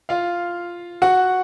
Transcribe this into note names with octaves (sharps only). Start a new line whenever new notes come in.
F4 F5
F#4 F#5